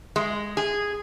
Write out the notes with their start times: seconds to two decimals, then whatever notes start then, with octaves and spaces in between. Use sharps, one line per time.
0.16 G#3
0.57 G#4